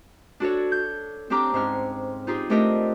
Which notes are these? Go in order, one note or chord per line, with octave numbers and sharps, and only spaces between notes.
D4 F#4 A4 C#5
G6
C4 D4 G4 A#5 D6 F6
G#2 C4 C#4 F6
D#4 F4 G4 G#4
A3 C4 D4 G4 A#4 D#5